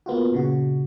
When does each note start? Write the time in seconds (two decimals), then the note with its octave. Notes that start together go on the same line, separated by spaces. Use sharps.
0.06 A#3 B3 F4 F#4
0.32 A#2 C#3 F#4